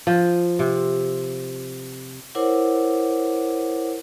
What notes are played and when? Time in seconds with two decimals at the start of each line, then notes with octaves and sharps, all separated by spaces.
0.07 F3
0.59 C3
2.35 E4 A#4 C5 C#5 F#5 D6